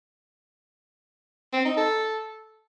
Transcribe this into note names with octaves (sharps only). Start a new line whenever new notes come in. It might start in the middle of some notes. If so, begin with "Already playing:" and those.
C4
D#4
A4